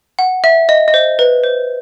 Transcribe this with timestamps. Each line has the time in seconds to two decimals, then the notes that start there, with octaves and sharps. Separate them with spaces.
0.19 F#5
0.44 E5
0.69 D#5
0.88 D#5
0.94 C5
1.19 B4
1.44 C5